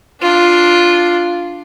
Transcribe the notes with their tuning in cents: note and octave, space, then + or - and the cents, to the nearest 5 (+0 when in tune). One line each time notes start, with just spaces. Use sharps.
D4 +0 F4 +0